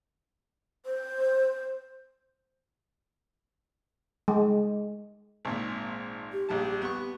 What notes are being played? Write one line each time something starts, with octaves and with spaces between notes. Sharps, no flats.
C5
G#3
G#1 A#2
G4
A#1 G3 A5
B3 C#6